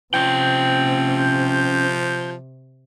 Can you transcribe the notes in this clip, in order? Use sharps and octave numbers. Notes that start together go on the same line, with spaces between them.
C3 F3 C#4 G5 G6